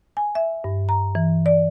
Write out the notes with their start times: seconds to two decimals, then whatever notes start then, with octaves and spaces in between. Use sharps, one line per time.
0.17 G#5
0.35 E5
0.64 G2
0.89 A#5
1.15 E3
1.46 D5